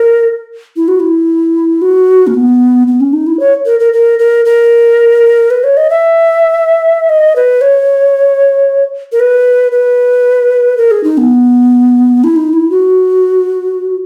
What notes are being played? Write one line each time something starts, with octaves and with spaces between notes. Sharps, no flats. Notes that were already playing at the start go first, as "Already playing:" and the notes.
Already playing: A#4
E4
F#4
E4
F#4
A#3
B3
B3
C#4
D#4
E4
C#5
A#4
A#4
A#4
A#4
A#4
B4
C#5
D#5
E5
D#5
B4
C#5
A#4
B4
B4
A#4
G#4
D#4
B3
E4
D#4
E4
F#4